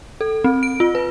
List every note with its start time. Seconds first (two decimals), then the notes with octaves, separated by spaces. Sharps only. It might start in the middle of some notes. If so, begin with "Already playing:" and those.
0.21 A4
0.44 C4
0.63 D7
0.80 F4
0.95 B4